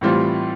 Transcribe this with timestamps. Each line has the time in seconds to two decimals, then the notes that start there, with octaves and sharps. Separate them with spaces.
0.01 A2 E3 G3 C4 F4